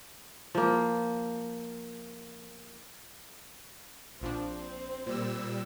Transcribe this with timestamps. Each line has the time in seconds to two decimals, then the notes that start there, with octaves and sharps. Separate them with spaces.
0.55 F3 A#3
4.22 A#1 F3 C4 D4
5.06 A#2 G3 E6